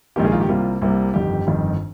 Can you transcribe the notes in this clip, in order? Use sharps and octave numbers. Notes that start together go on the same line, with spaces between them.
A#1 G#2 D#3 A#3 G4
G#4
F4
G4
C2 C3 G3 A#3 F4
C2 C3 G3 A#3
G1 F2 D#3 G4
G1 F2 D#3